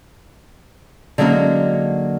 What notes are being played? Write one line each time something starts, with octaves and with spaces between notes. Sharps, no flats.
D3 F#3 G#3 A#3 C#4 D#4